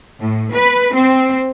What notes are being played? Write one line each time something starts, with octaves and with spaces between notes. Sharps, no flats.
A2
B4
C4